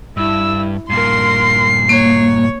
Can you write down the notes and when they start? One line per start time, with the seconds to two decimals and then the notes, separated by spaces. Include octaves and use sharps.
0.17 G2 E4 E6
0.90 G2 A#2 A#4 C6 C7
1.89 A#3 C#5